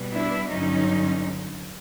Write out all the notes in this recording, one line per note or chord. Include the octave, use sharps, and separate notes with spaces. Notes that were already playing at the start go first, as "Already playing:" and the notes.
Already playing: B2 G3 B3
D4 E4
G2 D3 F#3 C#4 D#4